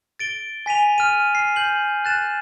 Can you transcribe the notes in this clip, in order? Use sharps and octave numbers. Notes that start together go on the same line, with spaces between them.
A6 D7 G7
G#5 B6 D#7 F7
F6 D#7
C7
G6 F#7
F#6 A6 E7